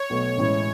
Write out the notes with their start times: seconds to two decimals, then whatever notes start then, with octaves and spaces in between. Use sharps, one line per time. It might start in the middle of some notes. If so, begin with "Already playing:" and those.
Already playing: C#5
0.10 B1 B2 A3
0.37 A1 A2 G#3 C#4 E4